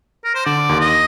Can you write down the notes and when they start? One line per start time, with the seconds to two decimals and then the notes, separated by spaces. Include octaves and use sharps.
0.25 A#4
0.35 C5
0.45 D3 D5
0.69 D#2
0.80 D#5